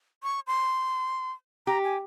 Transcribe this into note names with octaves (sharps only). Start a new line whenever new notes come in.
C#6
C6
G4 A#5
G#5